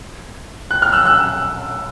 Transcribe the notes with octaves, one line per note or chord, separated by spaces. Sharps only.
F#6
F6
E6 F#6
E6 F#6